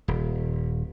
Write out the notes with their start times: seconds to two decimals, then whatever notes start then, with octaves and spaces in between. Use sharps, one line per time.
0.08 D#1